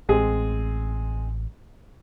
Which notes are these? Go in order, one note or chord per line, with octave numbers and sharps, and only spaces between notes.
A1 G#3 C4 G#4